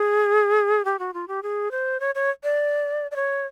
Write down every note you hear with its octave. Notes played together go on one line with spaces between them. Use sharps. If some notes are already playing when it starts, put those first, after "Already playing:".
Already playing: G#4
G4
F#4
F4
G4
G#4
C5
C#5
C#5
D5
D5
C#5